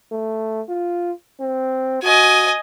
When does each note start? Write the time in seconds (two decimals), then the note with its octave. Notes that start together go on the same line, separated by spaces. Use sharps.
0.12 A3
0.69 F4
1.40 C4
2.03 F#4 D#5 G#5